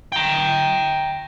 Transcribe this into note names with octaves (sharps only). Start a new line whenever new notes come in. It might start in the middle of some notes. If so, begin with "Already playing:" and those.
G5 A#5